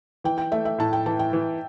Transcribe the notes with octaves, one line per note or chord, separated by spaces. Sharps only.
E3 G5
G5
A3 E5
E5
A2 A5
G5
E3 A5
G5
E3